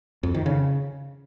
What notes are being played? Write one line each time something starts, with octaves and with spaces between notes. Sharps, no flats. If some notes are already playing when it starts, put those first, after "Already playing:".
F2
D#3
C#3